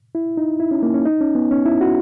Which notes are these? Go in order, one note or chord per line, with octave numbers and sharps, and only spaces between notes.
E4
D#4
E4
C#4
A#3
C#4
D#4
C#4
B3
C#4
E4
F#4